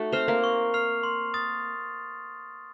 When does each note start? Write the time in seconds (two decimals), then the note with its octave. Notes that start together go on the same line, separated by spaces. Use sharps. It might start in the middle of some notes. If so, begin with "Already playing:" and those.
Already playing: A3 D#4 F#4 A4
0.12 C4 C5 F6 C7 F7
0.28 A#3 A#4
0.44 C#6
0.74 F6 C7 F7
1.03 C6
1.34 D#6 A6